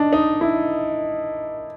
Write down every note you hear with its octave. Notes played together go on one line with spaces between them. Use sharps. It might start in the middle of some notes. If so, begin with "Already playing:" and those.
Already playing: D4 D#4
D#4
E4